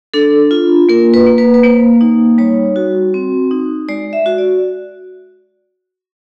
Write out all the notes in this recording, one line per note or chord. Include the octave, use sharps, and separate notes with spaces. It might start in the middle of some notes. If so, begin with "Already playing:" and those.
D4 A4
F4
A#3 A#4
B4
A#3
B4
B4
A#3 C5
D#4
G3 C#5
F#4
C4
D#4
G#3 D5
E5
F#4
D5